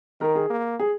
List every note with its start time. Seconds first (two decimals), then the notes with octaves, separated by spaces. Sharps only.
0.21 D#3 A#4
0.35 G#4
0.50 A#3
0.79 G#4